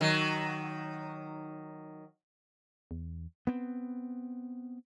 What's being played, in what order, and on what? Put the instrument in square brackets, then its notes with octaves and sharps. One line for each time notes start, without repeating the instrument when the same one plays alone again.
[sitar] D#3 F#3
[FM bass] E2
[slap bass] B3 C4